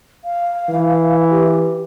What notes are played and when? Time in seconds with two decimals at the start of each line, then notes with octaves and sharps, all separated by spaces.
0.24 F5
0.69 E3
1.30 G4